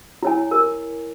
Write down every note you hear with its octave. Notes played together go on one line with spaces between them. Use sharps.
E4 C#5 G#5
A#4